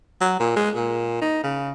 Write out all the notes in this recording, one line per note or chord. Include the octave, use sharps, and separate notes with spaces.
F#3
A#2
G#3
A#2
D#4
C#3